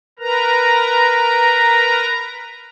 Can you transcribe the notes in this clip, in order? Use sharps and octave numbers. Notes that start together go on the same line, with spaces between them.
A#4 B4 A#5